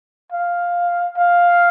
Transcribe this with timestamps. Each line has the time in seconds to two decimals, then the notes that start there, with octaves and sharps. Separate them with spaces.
0.32 F5
1.17 F5